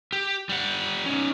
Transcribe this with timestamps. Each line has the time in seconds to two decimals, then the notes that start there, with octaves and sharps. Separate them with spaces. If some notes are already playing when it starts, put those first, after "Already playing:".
0.13 G4
0.49 G3 F#5
1.06 C#4 D#4